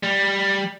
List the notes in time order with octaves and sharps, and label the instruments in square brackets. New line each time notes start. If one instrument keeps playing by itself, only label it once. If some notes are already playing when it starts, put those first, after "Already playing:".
[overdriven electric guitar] G3